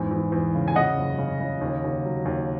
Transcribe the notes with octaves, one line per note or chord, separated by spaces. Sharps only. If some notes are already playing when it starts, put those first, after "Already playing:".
Already playing: E2 G#2
E2
E2
C#3
G#5
C#3 D#5 F#5
F#1
C#3
C#3
D#2
D#2
F#3
D#2